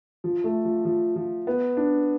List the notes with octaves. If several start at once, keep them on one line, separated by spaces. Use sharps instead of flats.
F3
A3
F3
F3
F3
B3
D4